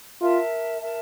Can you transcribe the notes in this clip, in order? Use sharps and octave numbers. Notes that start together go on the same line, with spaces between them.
F4 A#4 E5 A5
A#4 E5 A5